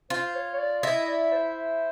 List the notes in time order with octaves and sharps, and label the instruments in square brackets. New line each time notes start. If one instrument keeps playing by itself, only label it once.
[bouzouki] F4 [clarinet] C5
[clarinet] C#5
C#5
D5
[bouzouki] E4 [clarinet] D#5
[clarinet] D5
C5